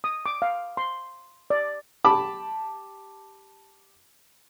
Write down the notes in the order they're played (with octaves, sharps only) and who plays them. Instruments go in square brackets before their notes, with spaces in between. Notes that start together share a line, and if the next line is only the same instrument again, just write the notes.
[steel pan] D#6
D6
F5
C6
D5
[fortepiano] G4 A5 B5 D6